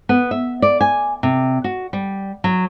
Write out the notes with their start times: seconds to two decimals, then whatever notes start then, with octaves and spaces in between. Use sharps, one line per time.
0.09 B3
0.31 E5
0.62 D5
0.81 G#5
1.23 C3
1.64 F#4
1.93 G3
2.44 F#3